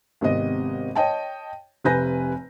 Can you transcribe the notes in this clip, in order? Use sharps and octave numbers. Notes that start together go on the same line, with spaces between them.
G#1 C3 B3 D#5
C#5 D#5 G5 A5
F1 C3 B4 G#5 G6 A#6